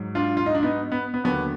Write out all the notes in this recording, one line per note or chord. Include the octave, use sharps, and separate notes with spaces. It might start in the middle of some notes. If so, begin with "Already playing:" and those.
Already playing: G#2 F#3
D4 F4
F4
D#4
D4
B3 D#4
B3
B3
D#2 D3 F#3 B3